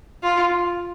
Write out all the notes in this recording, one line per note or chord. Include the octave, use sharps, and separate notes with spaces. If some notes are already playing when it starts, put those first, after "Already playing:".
F4